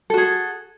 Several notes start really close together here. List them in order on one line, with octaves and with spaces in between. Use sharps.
A4 F#4 G#4